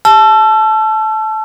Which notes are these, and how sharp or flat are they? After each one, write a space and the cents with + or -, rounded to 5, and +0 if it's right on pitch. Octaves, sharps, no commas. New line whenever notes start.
A5 -15 E6 +35